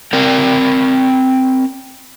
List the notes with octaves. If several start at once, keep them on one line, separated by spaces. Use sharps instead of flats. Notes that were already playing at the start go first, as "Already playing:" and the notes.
C4 A#4 D5